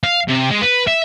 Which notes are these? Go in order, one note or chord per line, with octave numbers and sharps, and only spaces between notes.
F5
C3
G#3
B4
E5